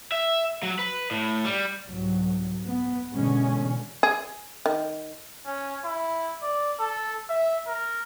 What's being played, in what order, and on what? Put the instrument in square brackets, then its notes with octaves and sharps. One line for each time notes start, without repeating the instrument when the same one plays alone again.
[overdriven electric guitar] E5
F#3
B4
A2
G3
[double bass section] C2 G#2 F#3
B3
B2 D3 E3 G#3 C#4
[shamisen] G#4
D#3
[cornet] C#4
E4
D5
A4
E5
A#4